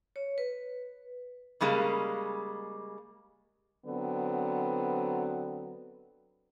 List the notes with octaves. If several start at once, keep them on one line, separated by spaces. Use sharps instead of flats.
C#5
B4
C#3 G3 G#3 A#3
D3 F#3 B3 C4